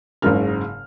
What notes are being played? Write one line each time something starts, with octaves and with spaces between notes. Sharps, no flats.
F#1 G#2 C#3 G#3 A#4 F6